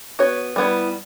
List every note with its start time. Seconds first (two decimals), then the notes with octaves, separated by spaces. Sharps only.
0.19 B3 F#4 C#5
0.56 G3 B3 E4